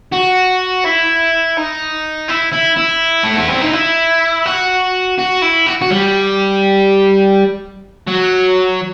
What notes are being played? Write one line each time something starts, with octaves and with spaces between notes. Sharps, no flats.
F#4
E4
D#4
E4
E4
E4
A3
B3
C4
D#4
E4
F#4
F#4
E4
F#4
F#4
G3
F#3